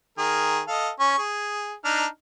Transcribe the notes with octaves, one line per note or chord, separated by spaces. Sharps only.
D#3 G#4 A#4
A4 D#5 F5
C#4 C#6
G#4
D4 D#4 F6